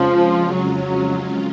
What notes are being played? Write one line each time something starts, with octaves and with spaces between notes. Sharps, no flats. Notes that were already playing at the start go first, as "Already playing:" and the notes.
Already playing: F2 C#3 F3 G#3 C#4 F4
F#3